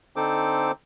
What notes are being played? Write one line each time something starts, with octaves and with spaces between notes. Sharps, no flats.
D3 C4 D#4 A4 C5 D6